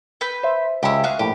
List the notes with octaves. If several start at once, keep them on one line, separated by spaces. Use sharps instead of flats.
B4 G6
C5 E5
C#2 G#3 E4 G4
F#4 G#4 F5
A#1 A2 G4